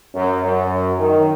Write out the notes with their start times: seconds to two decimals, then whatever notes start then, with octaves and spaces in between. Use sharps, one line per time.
0.15 F#2
0.43 F#2
0.99 D#3